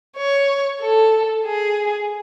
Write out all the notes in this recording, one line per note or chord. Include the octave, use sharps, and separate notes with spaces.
C#5
A4
G#4